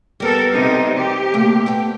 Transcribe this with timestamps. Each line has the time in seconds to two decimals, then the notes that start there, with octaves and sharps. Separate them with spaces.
0.20 G3 B3 A4 A#4
0.52 C3 D#4
0.96 G4
1.34 C3 A3 A#3
1.66 A3 B3 G5